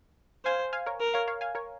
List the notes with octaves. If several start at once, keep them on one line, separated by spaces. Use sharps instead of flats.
C5 F5 G#5
F5 G#5
A#4 C#5
A#4
C#5 F5
C#5 F5
F5 G#5
A#4 C#5